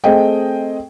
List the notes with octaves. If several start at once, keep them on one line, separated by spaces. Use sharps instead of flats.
A3 C4 G#4 D#5 G5